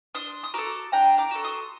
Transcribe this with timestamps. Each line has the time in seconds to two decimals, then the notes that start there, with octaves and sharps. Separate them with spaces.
0.15 D4 C6 D#6
0.43 D#6
0.54 F#4 A4 A#5 D6
0.92 D4 G5 A#5
1.18 A#5 D6
1.31 F#4 A4
1.44 C6 D#6